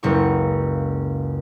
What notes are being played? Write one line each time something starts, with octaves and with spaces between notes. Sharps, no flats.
F#1 C#2 C#6